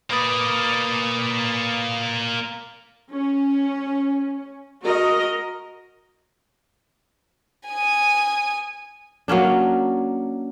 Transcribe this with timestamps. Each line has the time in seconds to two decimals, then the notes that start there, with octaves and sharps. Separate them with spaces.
0.11 A#3 B4 D5 B5 D#6
3.13 C#4
4.82 F#4 A#4 D#5
7.69 G#5 D#6
9.28 F#3 A#3 C#4 D4